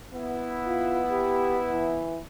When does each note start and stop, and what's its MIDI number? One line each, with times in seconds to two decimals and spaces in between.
0.14 2.09 59
0.14 2.09 64
0.67 1.01 65
1.11 1.59 67
1.71 2.19 52